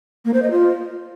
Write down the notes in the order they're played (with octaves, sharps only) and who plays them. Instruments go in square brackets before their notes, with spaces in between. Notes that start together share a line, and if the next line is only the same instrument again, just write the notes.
[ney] A#3
C5
D#5
F4